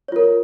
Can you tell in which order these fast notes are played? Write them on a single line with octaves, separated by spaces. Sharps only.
C#5 F4 A#4